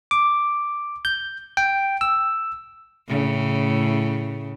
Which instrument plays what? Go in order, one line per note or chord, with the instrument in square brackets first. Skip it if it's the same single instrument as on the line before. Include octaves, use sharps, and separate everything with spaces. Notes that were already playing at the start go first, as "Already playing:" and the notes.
[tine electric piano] D6
G6
G5
E6
[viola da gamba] A2 C#3